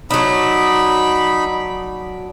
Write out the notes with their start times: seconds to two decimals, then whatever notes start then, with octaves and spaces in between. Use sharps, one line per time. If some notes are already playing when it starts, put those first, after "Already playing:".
0.11 F#3 D4 D#4 B5